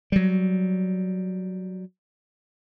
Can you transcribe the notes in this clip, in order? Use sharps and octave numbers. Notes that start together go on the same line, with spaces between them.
F#3 G3